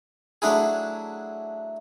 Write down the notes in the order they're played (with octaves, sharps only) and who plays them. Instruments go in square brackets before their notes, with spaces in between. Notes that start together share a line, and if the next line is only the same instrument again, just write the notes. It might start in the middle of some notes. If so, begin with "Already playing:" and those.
[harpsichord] F#3 A3 D4 E4 G#4